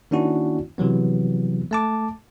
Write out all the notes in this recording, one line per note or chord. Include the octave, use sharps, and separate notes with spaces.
D#3 A#3 C#4 D4 E4 F#4
C3 E3 F#3 B3
A3 A5 D6